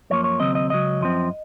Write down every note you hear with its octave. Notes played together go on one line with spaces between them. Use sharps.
F#2 F3 A#3 C#5
C#5
D#2 C#3 F#3 C4 D#5
D#5
C#2 C#3 F#3 D#5
F#2 F3 C4